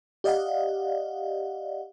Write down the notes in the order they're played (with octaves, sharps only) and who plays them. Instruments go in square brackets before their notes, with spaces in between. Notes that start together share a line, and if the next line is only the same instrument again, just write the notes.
[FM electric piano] G4 D5 D#5 F5 F#5